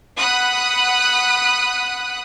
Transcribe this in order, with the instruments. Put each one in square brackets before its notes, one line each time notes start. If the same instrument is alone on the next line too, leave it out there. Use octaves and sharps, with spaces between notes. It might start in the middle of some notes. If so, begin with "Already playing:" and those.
[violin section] F#5 B5 D#6 F#6